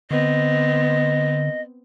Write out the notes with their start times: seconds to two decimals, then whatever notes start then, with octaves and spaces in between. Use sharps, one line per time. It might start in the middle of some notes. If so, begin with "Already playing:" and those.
0.11 D3 B3 C4 D#5